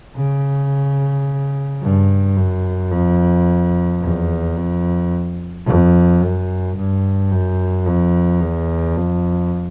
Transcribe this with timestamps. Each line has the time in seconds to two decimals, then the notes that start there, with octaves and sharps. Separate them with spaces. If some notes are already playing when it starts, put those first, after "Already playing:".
0.16 C#3
1.81 G2
2.36 F#2
2.90 F2
4.01 E2
4.56 F2
5.66 F2
6.21 F#2
6.76 G2
7.31 F#2
7.86 F2
8.40 E2
8.96 F2